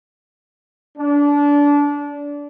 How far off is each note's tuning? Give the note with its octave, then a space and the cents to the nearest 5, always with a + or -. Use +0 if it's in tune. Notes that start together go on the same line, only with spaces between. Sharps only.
D4 -25